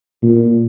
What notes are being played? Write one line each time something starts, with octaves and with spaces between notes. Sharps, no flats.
A#2